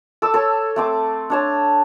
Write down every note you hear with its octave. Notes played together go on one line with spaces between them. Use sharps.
A4 D6 E6
A4 C#5
A3 C4 D6
D4 C#5 A5